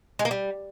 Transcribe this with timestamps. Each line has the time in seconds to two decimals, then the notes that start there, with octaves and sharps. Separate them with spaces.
0.19 G#3
0.25 A#3
0.31 G3